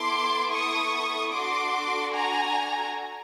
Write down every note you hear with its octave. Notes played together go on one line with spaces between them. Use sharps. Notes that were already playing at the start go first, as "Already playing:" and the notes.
Already playing: B3 E4 A4 C6 D6
C#6 D#6
D4 F#4 A4 C6 D6
G#5 A#5